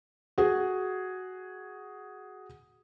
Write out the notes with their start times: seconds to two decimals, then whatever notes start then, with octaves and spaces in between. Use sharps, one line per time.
0.38 F#4 G#4